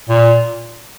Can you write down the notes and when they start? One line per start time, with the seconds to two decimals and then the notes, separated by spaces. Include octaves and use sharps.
0.09 A#2